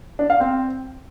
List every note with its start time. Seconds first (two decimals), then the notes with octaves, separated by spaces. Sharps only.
0.19 D4
0.30 F5
0.40 C4